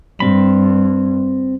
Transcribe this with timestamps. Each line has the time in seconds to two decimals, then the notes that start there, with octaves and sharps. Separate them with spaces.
0.20 G2 C4 B5